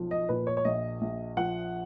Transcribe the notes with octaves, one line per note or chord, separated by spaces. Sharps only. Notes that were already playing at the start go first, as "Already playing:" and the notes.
Already playing: B1 F3
D#5
A#2 B4
C#5
C#5
A#1 D#5
A#1
F3 F#5